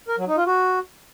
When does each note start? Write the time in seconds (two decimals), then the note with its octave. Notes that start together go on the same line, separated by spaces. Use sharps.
0.08 A#4
0.18 F#3
0.27 D#4
0.37 F4
0.46 F#4